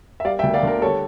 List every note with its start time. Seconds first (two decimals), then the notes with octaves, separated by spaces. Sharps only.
0.20 E5
0.24 G3 D5 F5
0.39 E5 G5
0.43 D2
0.53 D5 F5
0.63 D3 A#4
0.82 G3 A4 C#5